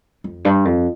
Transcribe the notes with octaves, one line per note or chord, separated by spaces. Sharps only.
F2
G2
F2